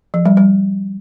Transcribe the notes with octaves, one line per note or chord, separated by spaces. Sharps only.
F3
G3
G3